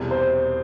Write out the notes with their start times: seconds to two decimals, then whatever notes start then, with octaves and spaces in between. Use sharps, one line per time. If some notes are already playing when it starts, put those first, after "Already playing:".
Already playing: E1 E2 C3 G3
0.11 C5